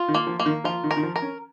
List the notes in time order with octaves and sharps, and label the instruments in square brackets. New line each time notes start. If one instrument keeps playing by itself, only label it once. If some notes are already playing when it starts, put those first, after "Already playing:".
Already playing: [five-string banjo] F4
[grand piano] D#3
[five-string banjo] A#3
[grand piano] F3
[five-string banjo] A#3
[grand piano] D#3
[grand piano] F3 [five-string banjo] F4
[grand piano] D#3
[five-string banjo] A#4
[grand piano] D#3
F3
[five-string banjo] A#4
[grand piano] C#4